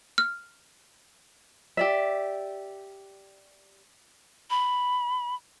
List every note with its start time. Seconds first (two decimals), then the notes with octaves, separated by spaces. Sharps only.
0.18 F6
1.77 G4 D5 E5
4.50 B5